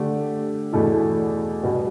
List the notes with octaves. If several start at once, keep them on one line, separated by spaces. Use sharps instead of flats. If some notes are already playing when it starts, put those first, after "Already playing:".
Already playing: D3 A3 D4 G4
E2 B2 A3 E4 A4
B2 G3 B3 F#4